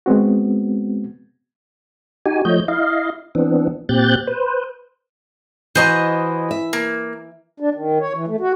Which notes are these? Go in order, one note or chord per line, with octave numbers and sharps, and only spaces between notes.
G#3 B3 C4 F#4
D#4 F#4 G4 G#5
F3 A3 C#5 D#5 G6
E4 D#5 F5
E3 B3 C4 D4
A#2 C4 G4 F#6 G6 A6
B4 C5
E3 F#4 C5 D#5 A#5
E5
A#3
D4
D#3
C#5
E3
A3
F#4